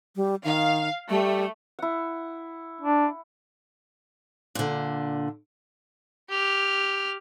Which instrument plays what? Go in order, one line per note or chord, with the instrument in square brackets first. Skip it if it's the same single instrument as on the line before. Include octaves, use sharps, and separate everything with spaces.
[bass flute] G3
[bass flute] D#3 [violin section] F5
[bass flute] G3 [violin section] A3
[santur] E4 F#5
[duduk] D4
[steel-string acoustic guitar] A#2 D3
[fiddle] G4 F6